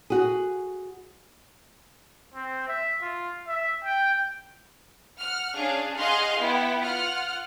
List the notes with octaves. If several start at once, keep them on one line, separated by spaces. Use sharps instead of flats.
F#4 G#4
C4
E5
F4
E5
G5
F#5 F6
C#4 D4 G#4 F5
G#4 D#5 F5 F#5 C6 F6
B3 E4 G5
F4 F#5 F6